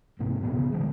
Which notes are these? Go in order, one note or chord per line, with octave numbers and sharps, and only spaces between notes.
A1 G#2 C3 A#3
D1 A1 B2 B3
C#3
D3 E3 G3 G#3